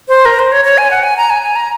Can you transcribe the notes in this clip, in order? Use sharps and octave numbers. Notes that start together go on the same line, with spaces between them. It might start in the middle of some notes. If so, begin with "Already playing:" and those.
C5
A#4
C5
C#5
C#5
G#5
F#5
G#5
A#5
G#5
G#5
A#5